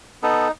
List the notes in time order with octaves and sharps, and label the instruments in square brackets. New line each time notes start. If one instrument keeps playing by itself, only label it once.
[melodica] B3 D#4 A4